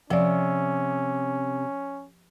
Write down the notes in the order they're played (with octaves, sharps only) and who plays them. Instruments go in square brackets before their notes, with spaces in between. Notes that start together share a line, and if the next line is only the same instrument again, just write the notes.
[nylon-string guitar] C3 [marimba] F3 D5 [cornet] C#4